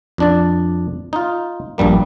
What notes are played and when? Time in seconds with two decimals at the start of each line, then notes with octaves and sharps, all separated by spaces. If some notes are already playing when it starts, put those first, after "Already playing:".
0.18 F2 D4 D5
1.13 D#4 F4
1.78 A#1 G2 G3 A#3